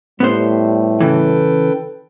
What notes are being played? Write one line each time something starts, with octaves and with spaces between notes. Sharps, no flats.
A2 G3 B3 C5
C#3 E3 A4 B4 G5